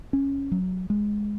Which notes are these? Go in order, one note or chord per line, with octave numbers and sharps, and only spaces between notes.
C#4
F#3
G#3